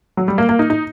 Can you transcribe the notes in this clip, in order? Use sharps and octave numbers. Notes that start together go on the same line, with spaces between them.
F#3
G3
A#3
A#3
D#4
D#4